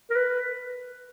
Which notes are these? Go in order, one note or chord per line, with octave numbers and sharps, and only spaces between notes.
A#4
B4